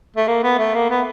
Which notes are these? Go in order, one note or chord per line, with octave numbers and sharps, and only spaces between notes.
A3
A#3
B3
A3
A#3
B3